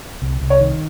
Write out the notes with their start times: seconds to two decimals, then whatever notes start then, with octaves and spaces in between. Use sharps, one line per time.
0.22 C2
0.41 C2
0.50 C#5
0.60 D#3